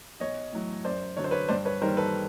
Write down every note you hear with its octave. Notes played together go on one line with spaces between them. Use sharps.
B1 C#5 D#5
A2 F#3
F#2 C5 D5
D3 F#3 C#5
C5
B4 C#5
G2 C5 D5
B4 C#5
D#3 G3 A#3 A#4 C5
A4 B4